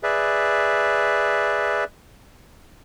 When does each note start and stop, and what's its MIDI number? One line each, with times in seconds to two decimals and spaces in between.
0.03 1.84 68
0.03 1.84 71
0.03 1.84 74
0.03 1.84 76